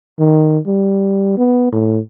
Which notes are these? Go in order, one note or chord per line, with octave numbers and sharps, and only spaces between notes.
D#3
G3
B3
A2